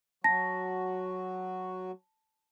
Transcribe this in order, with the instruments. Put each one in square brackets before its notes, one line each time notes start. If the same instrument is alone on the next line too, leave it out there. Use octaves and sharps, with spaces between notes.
[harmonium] F#3 F#4 [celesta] A5 A#6